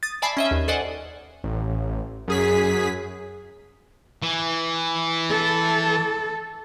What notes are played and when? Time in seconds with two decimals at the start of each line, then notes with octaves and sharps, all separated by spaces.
0.03 D#6 A6
0.22 D5 E5 G#5 A5 B5 C7
0.37 C#4 D#5 E5
0.51 D#2
0.68 A4 C5 D5 D#5 F#5 G#5
1.44 A1
2.28 F#2 G#4 B6
4.22 E3
5.30 A4